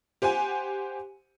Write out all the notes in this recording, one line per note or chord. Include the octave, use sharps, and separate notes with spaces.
G4 C5 F#5 G#5